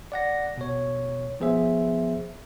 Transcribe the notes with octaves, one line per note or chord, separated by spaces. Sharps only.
D5 F#5 A#6
B2 C#5
F3 B3 G#4 C5 E5